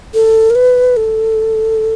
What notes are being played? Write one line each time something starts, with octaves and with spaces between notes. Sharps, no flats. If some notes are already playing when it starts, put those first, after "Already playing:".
A4
A#4
B4
A4